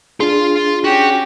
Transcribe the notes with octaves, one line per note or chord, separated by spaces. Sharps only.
D4 F4 G#4 C6
C#4 F#4 G4